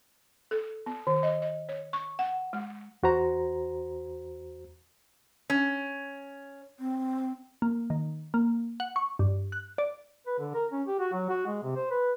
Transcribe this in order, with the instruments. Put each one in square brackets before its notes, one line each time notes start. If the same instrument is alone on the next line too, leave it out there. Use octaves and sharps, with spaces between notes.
[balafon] A4
B3
D#3
D#5
D#5
C#5
C#6
F#5
G#3
[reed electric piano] E2 F#4 C5 A#5
[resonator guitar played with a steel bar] C#4
[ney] C4
[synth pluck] A#3
D#3
A#3
F#5
C#6
G2
F#6
D5
[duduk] B4
D3
A#4
C#4
G4
F#4
F#3
F#4
G#3
C3
C5
B4